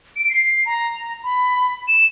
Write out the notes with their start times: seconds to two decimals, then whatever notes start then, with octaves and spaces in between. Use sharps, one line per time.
0.16 D7
0.30 C7
0.66 A#5
1.23 B5
1.88 E7